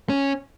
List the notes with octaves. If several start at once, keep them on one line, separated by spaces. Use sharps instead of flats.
C#4